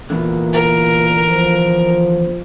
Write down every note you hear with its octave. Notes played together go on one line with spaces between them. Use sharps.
A#2 D3 E3 B3
A#4
F3